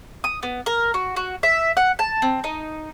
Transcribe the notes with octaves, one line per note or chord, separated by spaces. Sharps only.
D#6
B3
A#4
F#4
F#4
E5
F#5
A5
C4
D#4